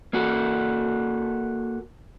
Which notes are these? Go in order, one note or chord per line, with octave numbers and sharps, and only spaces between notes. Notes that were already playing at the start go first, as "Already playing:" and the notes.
A#3 F#4 A4